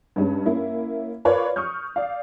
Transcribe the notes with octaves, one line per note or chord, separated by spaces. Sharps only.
G2 G3 G#3 C#4
A#3 C#4 E4
F4 A#4 B4 C#5 D5 F5
C#6 D#6 F6 G6
D5 F5